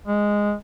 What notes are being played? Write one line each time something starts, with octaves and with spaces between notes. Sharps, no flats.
G#3